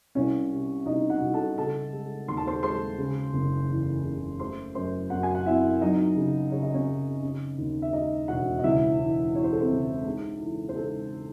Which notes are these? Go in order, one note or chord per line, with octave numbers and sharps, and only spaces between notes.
C2 C#4 C#5
C3
C2 D#4 D#5
F#4 F#5
C2
A4 A5
C#3 A4 A5
G#3
D#2 C6
A5
C5 C6
G#3 C5 C6
C#3
F#1
E2
C#3
A3 C5 C6
F#2 C5 C6
F#2 F#4 F#5
G#5
F#5
C4 E4 E5
F#3 D#4 D#5
C#3
C#3 C#5
D#5
C#4 C#5
C#3
C#3
D#2
E5
G#3 D#4 D#5
E1 F#4 F#5
D#5
C#2 E4 E5
E3
E3 C#5
C5
A4
C4 C5
C#2
G#2 G#4
E3
C5
G#2 A4